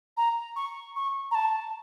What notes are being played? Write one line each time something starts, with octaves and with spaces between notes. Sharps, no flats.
A#5
C#6
C#6
A#5
A5